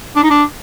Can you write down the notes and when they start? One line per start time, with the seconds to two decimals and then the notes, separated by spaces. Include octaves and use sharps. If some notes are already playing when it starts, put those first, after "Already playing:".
0.16 D4
0.23 D#4
0.30 D4